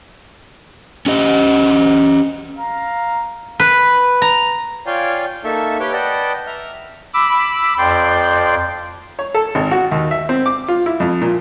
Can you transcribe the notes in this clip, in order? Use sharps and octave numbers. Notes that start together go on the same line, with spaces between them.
C#4 G4 D#5
F5 A#5
B4
A#5
F4 C#5 D5 F5 G5 G#5
A#3 D#4 A4 E5 A5 C#6
G4 B4 C#5 G5 D6
B4 D5 D#5 F#5 G5 A5
E5 A#5 F6
B5 D6 E6
F2 D5 G5 C6
C#5
A4
G#1
F#4
D#2
E5
C4
D6
F4
E4
F2
A#2